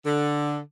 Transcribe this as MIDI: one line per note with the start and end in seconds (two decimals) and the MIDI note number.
0.04 0.59 50